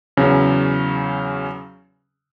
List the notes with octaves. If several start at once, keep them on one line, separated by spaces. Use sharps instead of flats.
E2 C#3 F#3 C#4